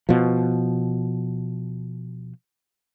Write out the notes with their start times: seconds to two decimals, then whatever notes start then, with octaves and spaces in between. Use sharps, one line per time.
0.09 B2 F3